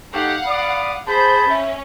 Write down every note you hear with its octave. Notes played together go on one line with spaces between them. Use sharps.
A3 D#4 G4 F5 F#5
D5 B5 D6 D#6
G#4 C5 A5 B5 G6
C#4 E5